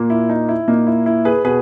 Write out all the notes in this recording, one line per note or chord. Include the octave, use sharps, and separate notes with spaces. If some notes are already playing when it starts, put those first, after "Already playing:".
Already playing: A#2 A#3
E4
D#4
E4
A#2 A#3 D#4
E4
E4
G#4 B4
B2 G#4 B4